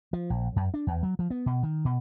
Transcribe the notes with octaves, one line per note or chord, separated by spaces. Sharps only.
F3
A#1
F#2
D4
E2
F#3
F3
B3
B2
D#3
B2